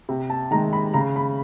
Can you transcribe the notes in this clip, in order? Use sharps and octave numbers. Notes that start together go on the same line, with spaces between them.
C3
A5
D#3 G#3 A#5
B5
C#3 A#5
B5